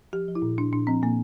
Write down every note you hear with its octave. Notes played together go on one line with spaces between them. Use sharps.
F3 G4
F3
E4
A#2
A#2 D4
A#2 D4
F3 C4
A#2 A#3